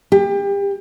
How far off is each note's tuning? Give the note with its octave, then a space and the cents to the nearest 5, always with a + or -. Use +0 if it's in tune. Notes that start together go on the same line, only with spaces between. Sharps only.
G4 +30